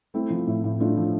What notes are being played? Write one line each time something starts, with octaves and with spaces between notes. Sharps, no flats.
A3 C4 E4
F3
A2
A2
A3 D4 F4
F3